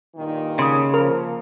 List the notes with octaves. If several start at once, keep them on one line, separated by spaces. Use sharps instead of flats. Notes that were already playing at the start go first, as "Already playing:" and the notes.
G2 A#2 D#3
C#3 C6 D#6
F3 A#3 A#4 B5